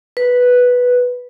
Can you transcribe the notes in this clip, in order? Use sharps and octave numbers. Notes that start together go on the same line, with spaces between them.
B4